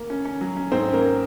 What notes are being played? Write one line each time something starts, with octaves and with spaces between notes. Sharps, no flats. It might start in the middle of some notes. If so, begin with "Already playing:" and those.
Already playing: A#3
C#4
C#4
F#3
C#4
G#2 C4 C5
C#4
A#3 A#4